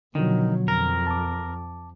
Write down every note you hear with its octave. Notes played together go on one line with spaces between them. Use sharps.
B2 D3 D#3 F3 F#3
F2 A#4
A5 D6